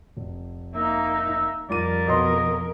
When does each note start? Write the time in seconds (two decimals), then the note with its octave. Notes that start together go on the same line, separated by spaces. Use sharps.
0.17 F1
0.75 A#3 D#4 E5
1.69 F2 G3 F4 A#4 D5 D#7
2.08 B1 B3 D#5 C6